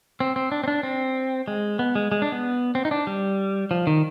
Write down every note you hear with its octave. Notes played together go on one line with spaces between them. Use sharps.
C4
C4
D4
C4
D4
C4
G#3
B3
G#3
G#3
D4
B3
C4
D#4
D4
G3
F3
D#3